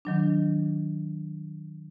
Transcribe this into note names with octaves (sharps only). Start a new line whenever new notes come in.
D#3 F#3 D4